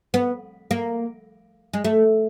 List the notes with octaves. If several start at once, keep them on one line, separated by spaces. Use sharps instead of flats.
B3
A#3
G#3
A3